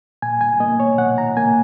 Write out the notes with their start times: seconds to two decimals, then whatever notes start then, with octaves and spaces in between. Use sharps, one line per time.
0.22 A#2 G#5
0.41 G#5
0.60 A#3 D#5
0.80 C#5
0.98 A#2 F#5
1.18 A#5
1.37 A#3 G#5